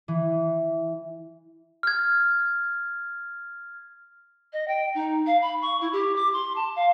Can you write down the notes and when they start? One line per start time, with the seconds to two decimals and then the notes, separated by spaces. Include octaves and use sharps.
0.08 E3
1.83 F6 G#6
4.53 D#5
4.68 G5
4.95 D#4
5.27 F5
5.42 B5
5.62 C#6
5.81 E4
5.93 G4
6.16 D6
6.33 C6
6.56 A5
6.76 F5